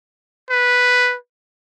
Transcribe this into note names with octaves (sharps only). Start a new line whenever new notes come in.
B4